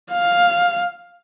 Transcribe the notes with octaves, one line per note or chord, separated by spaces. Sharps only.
F5